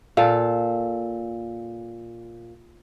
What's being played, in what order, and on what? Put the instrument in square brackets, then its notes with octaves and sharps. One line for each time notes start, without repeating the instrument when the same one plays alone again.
[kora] A#2 A4 [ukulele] F5